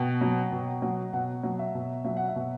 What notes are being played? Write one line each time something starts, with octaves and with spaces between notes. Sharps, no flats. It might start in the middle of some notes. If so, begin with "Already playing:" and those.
Already playing: B2 G5
F#3
B2
F#3
B2 F#5
F#3
E5
B2
F#3 E5
F#5
E5
B2